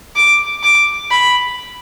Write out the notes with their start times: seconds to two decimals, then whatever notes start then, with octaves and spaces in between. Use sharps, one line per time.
0.16 D6
0.63 D6
1.11 B5